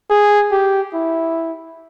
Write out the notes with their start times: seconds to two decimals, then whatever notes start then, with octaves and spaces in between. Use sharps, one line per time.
0.10 G#4
0.52 G4
0.94 E4